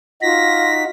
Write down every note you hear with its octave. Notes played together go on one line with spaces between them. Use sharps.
D#4 F4 F#4 A#6 B6